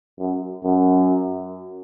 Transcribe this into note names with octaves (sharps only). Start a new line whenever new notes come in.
F#2
F#2